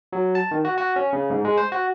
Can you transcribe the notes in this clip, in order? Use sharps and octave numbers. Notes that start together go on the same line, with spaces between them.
F#3
A5
D#3
F#4
F#4
C#4
C#3
G#2
G#3
C5
F#4